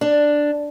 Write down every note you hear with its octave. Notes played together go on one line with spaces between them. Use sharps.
D4